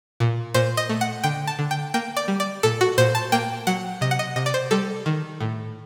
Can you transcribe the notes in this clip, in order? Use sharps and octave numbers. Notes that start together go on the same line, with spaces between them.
A#2
A#2 C5
D#5
A3
F#5
D3 G5
A5
D3
G5
A#3 G5
D5
G3
D5
A#2 A4
F#4
A#2 C5
A5
A#3 G5
F#3 F#5
C3 D#5
F#5
D#5
C3 D#5
D5
C5
G3 A4
D#3
A2